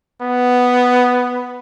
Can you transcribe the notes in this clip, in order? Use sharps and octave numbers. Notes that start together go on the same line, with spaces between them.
B3